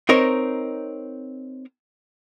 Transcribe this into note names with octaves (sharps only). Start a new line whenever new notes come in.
C4 D#4 A#4 C#5